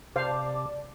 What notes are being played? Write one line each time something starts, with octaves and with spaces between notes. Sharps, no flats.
C3 C5 D5 F5 A5 D6